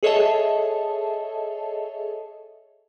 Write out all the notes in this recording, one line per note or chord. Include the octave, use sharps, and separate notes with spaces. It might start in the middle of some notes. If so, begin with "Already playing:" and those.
G#4 A4 C#5 D#5 E5 A5